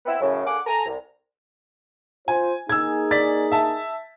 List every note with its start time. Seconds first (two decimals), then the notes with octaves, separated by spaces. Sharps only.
0.05 B3 C4 E4
0.20 F#2 A2 C#3
0.45 D3 A#3 G#4 F#5 G#5 D6
0.66 A4 G#5 A#5
0.86 C2
2.28 F4 C5 G#5
2.69 A#3 D#4 G#4 E6 G#6
3.11 D5 A6 B6
3.52 E5 A5